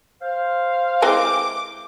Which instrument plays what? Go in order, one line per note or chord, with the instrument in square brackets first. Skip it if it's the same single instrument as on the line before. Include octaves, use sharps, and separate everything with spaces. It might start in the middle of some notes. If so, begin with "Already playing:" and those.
[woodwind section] C5 F5
[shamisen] E3 G#3 C4 [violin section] D6